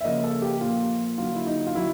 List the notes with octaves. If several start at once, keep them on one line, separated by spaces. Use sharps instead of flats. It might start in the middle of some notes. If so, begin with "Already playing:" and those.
E5
C#3 F3 A#3 D#5
A4
G4
A#2 F3 A#3 F4
D3 F#3 A#3 F4
E4
D#4
F4
D3 F#3 E4